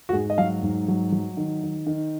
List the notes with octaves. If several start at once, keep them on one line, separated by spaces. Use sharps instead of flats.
F#4
G#2 G#4
D#5
F#3 F5
G#2
F#3
F#3
D#3
D#3
D#3